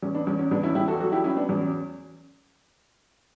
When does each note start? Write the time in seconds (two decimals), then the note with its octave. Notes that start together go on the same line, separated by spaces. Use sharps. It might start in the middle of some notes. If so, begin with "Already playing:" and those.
0.02 E2 C#4
0.15 B3 D4
0.27 E2 C#4
0.39 C#4
0.51 E2 B3 D4
0.63 C#4 E4
0.75 E2 E4 G4
0.88 F#4 A4
1.00 F#3 F#4 A4
1.12 E4 G4
1.24 F#3 C#4 E4
1.36 B3 D4
1.49 E2 C#4